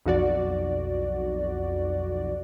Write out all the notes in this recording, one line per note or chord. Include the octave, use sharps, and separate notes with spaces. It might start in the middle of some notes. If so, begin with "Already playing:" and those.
B1 F2 F#4 D5